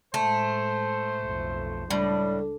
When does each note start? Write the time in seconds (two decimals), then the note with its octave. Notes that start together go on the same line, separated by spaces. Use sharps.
0.14 A2 G#3 A3 C5
1.20 B1 F2
1.91 C#2 A2 G3 D4